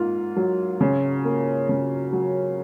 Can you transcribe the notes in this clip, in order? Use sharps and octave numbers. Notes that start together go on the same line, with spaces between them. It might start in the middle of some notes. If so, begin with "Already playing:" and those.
Already playing: G#2 A#3 F4
F#3
C#3
A#3
C#3
F#3